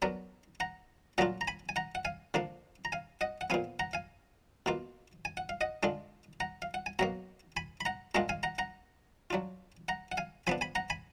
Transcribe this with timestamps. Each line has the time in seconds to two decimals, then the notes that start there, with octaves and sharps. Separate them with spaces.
0.02 F#3 B3 D4 A#4 D5
0.60 F#5 A#5
1.18 A#2 F#3 D4 F4 F#5 A#5
1.41 A#5
1.48 G#5 B5
1.69 G#5
1.76 F#5 A#5
1.95 F#5
2.05 F5 G#5
2.34 D3 F3 A#3 D4
2.85 A#5
2.92 F5 G#5
3.21 D#5 F#5
3.41 F#5
3.50 A#2 F3 B3 F5 G#5
3.79 F#5 A#5
3.93 F5 G#5
4.66 B2 A#3 F4
5.25 G#5
5.37 F#5
5.49 F5
5.61 D#5 F#5
5.83 D3 G#3 D4 F4
6.40 F#5 A#5
6.62 F5
6.74 F#5
6.86 G#5
6.99 B2 F#3 A#3 F#5 A#5
7.57 G#5 B5
7.81 B5
7.85 F#5 A#5
8.15 A#2 G#3 D4 F4 F#5 A#5
8.29 F5 G#5
8.43 F#5 A#5
8.58 F#5 A#5
9.30 F#3 D4 F4
9.88 F#5 A#5
10.12 F#5
10.17 F5 G#5
10.47 F3 B3 D4 G#5 B5
10.61 G#5 B5
10.75 F#5 A#5
10.90 G#5 B5